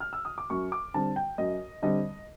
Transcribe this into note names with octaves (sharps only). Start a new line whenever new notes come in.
F6
E6
D#6
D6
F#2 C#6
D6
D3 G3 C4 A5
G5
F#2 D#5
D3 G3 C4 D#5